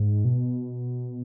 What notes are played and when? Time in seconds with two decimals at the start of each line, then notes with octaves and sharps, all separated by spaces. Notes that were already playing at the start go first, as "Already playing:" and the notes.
Already playing: G#2
0.25 B2